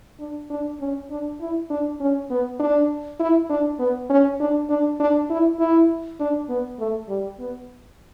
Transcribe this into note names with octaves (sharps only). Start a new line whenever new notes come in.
D4
D4
C#4
D4
E4
D4
C#4
B3
D4
E4
D4
B3
C#4
D4
D4
D4
E4
E4
D4
B3
A3
G3
B3